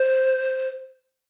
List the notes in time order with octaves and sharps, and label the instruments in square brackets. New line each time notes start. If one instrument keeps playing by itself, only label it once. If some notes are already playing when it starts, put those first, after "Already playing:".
Already playing: [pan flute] C5